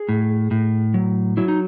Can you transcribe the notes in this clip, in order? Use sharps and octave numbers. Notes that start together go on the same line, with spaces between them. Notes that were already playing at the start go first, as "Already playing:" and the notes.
Already playing: G#4
A2
A2
F#3
F#3 E4
D#4